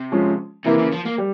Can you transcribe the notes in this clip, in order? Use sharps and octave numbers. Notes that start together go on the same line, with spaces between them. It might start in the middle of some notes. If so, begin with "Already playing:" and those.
Already playing: C3
F3 G#3 C#4 F4
C3 E3 A#3 E4
C#3
F3
A#3
G3